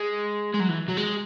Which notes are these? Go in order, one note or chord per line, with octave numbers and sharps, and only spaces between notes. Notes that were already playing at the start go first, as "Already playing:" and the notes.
Already playing: G#3
G#3
F#3
E3
F#3
G#3